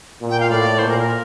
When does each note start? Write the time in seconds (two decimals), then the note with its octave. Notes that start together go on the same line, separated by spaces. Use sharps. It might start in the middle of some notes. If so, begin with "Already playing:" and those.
0.20 A#2
0.30 G5
0.40 F5
0.49 A2 D5
0.79 A#2 C5
0.88 A#4
0.99 A#4